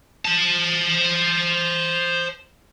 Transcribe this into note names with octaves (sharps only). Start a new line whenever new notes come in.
C5 A5